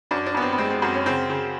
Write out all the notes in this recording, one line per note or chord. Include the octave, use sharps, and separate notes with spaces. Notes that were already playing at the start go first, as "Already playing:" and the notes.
F#2 D4
D4
F#2 B3
C4
B3
G#3 C4
C4
F#2 C4
C#4
C#3 C4
C#3